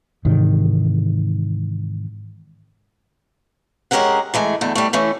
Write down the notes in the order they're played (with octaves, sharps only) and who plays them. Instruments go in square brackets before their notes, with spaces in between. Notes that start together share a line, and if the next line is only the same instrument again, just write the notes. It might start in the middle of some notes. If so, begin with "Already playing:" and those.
[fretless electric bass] G#2 C3 D#3 E3
[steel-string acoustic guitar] G#3 C#4 G4 G#4 A#4 F#5
E3 G#3 A3 G#5
E2 D3 A3
G3 A3
E3 A3 C#4